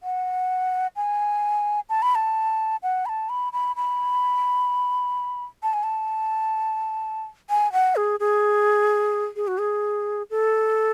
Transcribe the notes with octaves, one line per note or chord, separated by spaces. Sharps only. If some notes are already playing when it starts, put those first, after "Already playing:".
F#5
G#5
A5
B5
A5
F#5
B5
A5
B5
B5
B5
A5
G#5
A5
G#5
F#5
G#4
G#4
G#4
F#4
G#4
A4